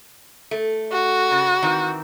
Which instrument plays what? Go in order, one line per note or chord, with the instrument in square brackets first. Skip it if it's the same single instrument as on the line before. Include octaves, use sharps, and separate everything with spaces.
[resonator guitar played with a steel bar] A3
[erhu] F#4
[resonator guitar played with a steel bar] C#3
D#3 E3 C4